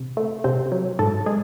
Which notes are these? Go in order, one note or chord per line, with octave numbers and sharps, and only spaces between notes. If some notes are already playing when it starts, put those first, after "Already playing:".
Already playing: C3
A3
C3 C4 C5
F#3
G#2 A4 A5
G#3 G#4 G#5